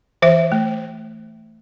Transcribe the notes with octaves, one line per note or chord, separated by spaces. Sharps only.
E3 C5 E5
A3